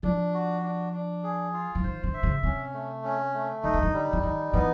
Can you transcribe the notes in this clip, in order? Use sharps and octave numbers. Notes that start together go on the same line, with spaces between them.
F3 D4
F#4
D4
D4
G#4
F4
E3
D#3 C5
D3
E5
C#3
C3 C#4
A3
C#4
A3
D3 D#4
C#3
D3
G3
D3
D#3 D#4
E3 B3